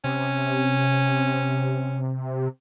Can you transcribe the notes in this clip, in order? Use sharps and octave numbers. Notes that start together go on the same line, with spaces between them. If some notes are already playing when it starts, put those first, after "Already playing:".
C3 C#4